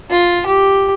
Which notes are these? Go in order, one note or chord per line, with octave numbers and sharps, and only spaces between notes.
F4
G4